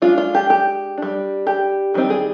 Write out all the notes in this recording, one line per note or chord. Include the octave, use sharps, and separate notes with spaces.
G#3 D4 F4
F4
G4
G4
G3 D4
G4
D#3 G3 C4 D#4
G#4